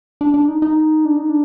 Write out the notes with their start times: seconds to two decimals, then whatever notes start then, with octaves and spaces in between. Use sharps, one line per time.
0.21 D4
0.34 D4
0.48 D#4
0.62 D#4
1.05 D4
1.17 D#4
1.30 D4